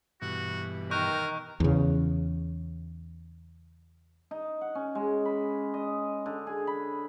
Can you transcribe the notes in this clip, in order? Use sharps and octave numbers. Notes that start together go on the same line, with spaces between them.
G2 B2 E3 F#4
D#3 A#4 C#6 F#6 G6
E2 C#3
D#4
F#5
C#4
G#3
B5
D#5
D3
G#4
B5